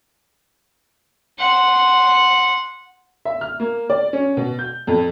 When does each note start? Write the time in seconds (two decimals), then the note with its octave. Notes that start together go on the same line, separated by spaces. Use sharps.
1.39 F#5 C6
3.25 E5
3.41 F6
3.60 A#3
3.90 D5
4.13 C#4
4.37 B2
4.59 G6
4.87 F2